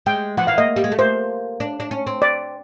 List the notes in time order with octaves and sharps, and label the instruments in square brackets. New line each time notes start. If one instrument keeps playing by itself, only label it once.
[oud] G#3 [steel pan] G5
[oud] F3 [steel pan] F#5
[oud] E3 [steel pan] F5
[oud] A#3 [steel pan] D#5
[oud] G3
G#3
A3
[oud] A#3 [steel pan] C5
[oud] D4
D4
C#4
C4
[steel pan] D5